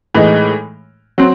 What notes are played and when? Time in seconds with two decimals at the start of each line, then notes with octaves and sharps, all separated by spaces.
0.14 A2 E3 G#3 D#4
1.18 F#3 C4